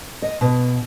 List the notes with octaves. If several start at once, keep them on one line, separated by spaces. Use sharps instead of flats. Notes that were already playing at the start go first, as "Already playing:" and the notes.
D#5
B2